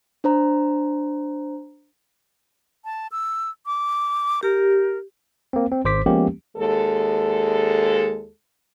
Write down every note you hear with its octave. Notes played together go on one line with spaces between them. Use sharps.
D4 C5 A#5
A5
E6
D6
G4 A#4
A#3 C4
C4
G#1 C5 D6 B6
F3 G#3 A#3 B3 C#4 G4
D#2 G#3 A4